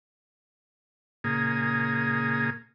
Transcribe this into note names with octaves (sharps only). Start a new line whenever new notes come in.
A#2 C#3 A#3 G#4 D#6